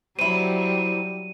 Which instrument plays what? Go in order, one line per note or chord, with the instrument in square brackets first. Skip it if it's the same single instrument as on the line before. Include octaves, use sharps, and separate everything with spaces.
[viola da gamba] F#3 G3 [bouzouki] C4 E4 [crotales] D#7